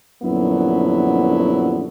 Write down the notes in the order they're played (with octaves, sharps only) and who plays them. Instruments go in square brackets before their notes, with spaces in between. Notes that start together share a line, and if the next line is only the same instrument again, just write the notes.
[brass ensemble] A#1 F#2 D3 F#3 B3 E4